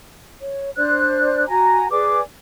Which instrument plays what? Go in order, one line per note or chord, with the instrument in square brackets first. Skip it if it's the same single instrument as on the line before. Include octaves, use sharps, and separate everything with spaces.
[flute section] C#5
D4 C5 D5 F#6
F#4 G#5 A#5
G#4 B4 D5 D6